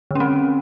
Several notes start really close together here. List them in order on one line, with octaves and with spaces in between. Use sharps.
D3 C#4 C4